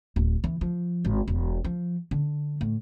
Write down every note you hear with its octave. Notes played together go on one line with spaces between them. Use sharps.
D1
E3
F3
G#1
E1
F3
D3
A2